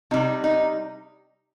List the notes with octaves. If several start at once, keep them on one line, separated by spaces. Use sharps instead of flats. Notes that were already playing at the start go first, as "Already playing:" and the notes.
C3 G3 D#4
D#4